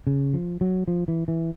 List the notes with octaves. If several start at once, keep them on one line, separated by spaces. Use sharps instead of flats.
C#3
F3
F#3
F3
E3
E3